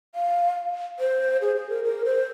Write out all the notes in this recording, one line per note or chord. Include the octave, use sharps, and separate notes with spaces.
F5
C5
G#4
G#4
A#4
A#4
C5